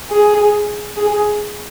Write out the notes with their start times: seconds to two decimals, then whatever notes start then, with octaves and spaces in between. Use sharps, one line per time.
0.10 G#4
0.97 G#4